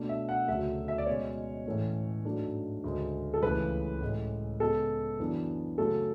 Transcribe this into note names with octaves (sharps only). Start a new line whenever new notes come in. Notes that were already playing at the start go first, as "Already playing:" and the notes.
Already playing: B2 A3 D4
E5
F#5
D2 C#3 F#3 A3 E5
E5
D5
B2 G#3 C#4 C#5
A2 E3 A3 C#4
G#2 F#3 A3 D4
D2 C#3 G#3
A4
C#2 C#3 E3 A3 B4
A2 G#3 C#4
C#3 G#3 B3 A4
F#2 E3 B3 D4
F#2 C#3 F#3 A3 A4